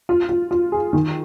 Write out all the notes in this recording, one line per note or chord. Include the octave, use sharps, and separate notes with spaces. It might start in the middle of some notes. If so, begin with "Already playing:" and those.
F4
F4
F4
G#4
D#3